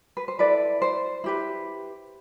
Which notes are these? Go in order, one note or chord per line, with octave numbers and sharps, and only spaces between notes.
B4
C5
E4 A4 B4 D5
C5
E4 G4 B4